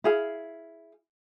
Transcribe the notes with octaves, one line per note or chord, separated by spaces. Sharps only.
E4 G#4 F5